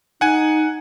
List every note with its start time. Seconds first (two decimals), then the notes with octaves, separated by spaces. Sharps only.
0.21 D#4 F#5 G#5